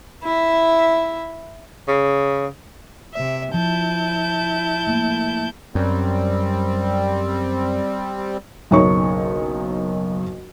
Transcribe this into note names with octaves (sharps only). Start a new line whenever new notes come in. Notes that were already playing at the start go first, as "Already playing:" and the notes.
E4 E5
C#3
C3 E5
F3 E4 A5 G6
A3 A#3
F#2 G3 C4
F#1 B1 D#4 C#5 C#6